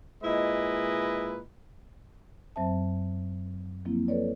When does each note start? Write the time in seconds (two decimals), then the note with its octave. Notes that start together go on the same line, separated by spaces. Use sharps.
0.24 A#2 G#3 E4 B4 D#5
2.56 F#2 F#3 C4 C5 E5 A5
3.85 F3 F#3 A#3 C4 E4
4.08 A4 B4 C#5 D5